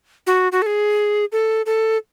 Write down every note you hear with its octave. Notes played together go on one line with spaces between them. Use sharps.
F#4
F#4
A4
G#4
A4
A4